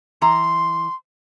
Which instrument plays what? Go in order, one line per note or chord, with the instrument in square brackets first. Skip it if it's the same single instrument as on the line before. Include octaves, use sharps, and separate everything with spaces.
[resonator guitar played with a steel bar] E3 A#5 [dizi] C6